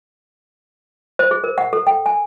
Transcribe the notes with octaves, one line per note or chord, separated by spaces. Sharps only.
C5
G#4
A#4
F#5
A4
G5
G#5